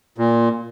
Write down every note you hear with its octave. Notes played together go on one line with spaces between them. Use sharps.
A#2